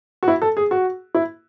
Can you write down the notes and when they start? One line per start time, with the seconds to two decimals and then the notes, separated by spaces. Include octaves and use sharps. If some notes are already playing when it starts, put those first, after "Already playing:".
0.23 F#4
0.28 E4
0.42 A4
0.57 G#4
0.71 F#4
1.15 E4